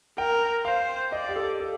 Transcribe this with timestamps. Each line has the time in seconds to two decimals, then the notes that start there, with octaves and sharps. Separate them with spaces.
0.18 A#4 G5
0.65 C5 F5
1.12 D5 D#5
1.29 G4
1.36 A4
1.60 A4